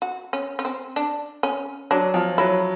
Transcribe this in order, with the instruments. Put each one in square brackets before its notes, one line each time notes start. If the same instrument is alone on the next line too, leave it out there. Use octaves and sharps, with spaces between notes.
[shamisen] F#4
C#4
C#4
C4
D4
C#4
[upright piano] F#3 [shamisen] D4
[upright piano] F3
[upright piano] F#3 [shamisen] E4